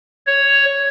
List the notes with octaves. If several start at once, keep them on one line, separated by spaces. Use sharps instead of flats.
C#5